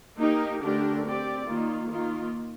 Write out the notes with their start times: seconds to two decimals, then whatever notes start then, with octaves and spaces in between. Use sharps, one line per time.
0.18 A#3 D#4 G4 A#4
0.61 D3 A3 D4 G4 A#4
1.04 C4 G4 D5
1.48 D#3 A#3 F4
1.90 D#3 A#3 F4